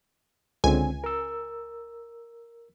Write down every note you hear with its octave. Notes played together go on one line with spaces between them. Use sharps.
C#2 D3 C4 G#5
A#4 E6